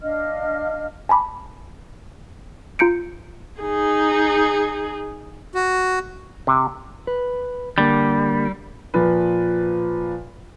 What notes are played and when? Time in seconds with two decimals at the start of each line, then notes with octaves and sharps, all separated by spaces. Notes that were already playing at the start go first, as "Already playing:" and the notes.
0.01 D4 D#5 F5 F6
1.09 G#5 A5 B5 D6
2.79 F4 A#5 G6 C#7 D7
3.61 D#4 G#4
5.54 F#4
6.47 C3
7.07 B4
7.78 D3 G3 A#3
8.94 A#2 F3 B4